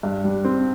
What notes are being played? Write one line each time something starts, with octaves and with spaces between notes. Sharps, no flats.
G2
G3
C4